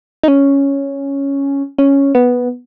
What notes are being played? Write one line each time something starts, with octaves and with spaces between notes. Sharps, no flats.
D#4
C#4
C#4
B3